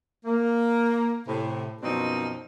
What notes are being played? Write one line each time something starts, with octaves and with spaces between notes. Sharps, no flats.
A#3
A2 C3
F#2 B2 F3 C4 D4 D#4